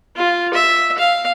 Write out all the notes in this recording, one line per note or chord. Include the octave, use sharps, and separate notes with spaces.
F4
E5
F5